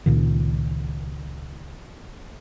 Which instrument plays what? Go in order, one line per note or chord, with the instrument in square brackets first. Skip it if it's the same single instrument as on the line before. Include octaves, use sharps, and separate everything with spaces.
[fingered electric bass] C#2 A#2 D#3